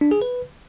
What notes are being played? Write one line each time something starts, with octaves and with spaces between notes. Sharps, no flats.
D4
G#4
B4